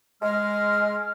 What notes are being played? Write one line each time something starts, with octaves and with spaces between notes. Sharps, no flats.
G#3 F6